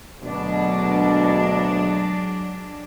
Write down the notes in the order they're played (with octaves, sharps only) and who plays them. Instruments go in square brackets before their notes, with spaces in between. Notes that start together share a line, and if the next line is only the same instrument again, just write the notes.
[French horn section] D2 B2 [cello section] F#3 G#3 D4